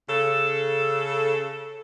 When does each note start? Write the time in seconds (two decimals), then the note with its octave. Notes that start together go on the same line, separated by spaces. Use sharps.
0.09 C#3 A4